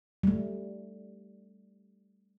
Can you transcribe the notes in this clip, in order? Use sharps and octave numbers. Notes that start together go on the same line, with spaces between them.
G3 A3